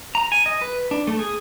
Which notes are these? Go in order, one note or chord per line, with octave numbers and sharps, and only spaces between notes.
A#5
G#5
D#5
B4
D4
A3
G#4